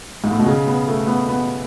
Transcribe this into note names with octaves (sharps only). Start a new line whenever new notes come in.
G#2
A2
B2
C#3
B3
A3
B3
B3